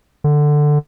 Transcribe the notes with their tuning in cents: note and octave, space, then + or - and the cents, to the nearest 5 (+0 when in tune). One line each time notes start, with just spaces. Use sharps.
D3 +10